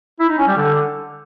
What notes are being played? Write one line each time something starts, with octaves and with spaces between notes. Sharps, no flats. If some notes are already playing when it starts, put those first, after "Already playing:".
E4
D#4
C#4
G3
D3